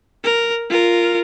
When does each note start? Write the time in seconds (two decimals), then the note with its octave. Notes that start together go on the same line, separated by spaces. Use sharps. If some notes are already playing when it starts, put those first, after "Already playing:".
0.24 A#4
0.70 F4 A#4